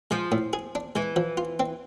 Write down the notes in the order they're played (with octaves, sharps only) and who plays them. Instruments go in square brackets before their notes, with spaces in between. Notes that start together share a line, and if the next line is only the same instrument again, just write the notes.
[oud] F3 [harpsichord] G#3
[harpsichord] A2
G#4
D4
[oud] E3 [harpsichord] G#3
[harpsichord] F3
F4
C4